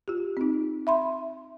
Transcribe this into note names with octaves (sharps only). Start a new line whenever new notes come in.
F4 G4
C4 D#4
E5 B5 C6